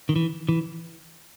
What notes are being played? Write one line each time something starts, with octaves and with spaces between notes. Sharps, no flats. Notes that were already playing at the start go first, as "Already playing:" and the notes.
D#3
E3
E3